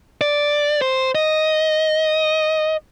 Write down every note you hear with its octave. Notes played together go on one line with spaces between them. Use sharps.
D5
C5
D#5